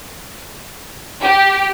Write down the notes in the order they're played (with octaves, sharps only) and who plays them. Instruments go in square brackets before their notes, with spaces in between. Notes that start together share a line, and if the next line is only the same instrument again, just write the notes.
[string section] G4